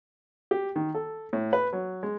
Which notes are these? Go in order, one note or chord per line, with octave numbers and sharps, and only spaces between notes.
G4
D#3
A4
A2
B4
F#3
G#3